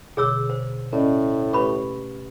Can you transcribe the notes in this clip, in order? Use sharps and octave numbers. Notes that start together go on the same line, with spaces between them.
B2 D3 G#4 C#5 E6
C5
A2 C#4 D5 D#5
A3 G4 B4 B5 C#6